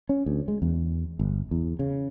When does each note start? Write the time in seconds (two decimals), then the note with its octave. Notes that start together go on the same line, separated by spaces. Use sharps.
0.09 C#4
0.26 D2
0.48 G#3
0.62 E2
1.19 G1
1.51 E2
1.79 C#3